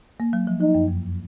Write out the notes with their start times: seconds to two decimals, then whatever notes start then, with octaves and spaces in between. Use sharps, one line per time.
0.20 A#3
0.33 F#3
0.47 F3
0.61 F3 D#4
0.75 F#2
0.88 F2